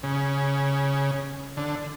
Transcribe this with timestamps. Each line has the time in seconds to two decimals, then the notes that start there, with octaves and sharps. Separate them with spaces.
0.03 C#3
1.57 D3